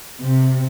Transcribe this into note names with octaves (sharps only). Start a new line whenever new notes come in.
C3